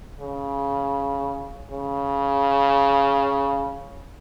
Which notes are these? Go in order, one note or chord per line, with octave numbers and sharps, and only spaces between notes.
C#3
C#3